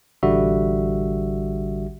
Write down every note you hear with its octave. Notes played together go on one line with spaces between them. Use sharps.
A1 D3 G3 F#4 E5